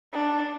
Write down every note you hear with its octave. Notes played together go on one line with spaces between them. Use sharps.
D4